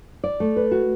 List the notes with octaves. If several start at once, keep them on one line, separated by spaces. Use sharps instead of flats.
D5
A3
B4
F#4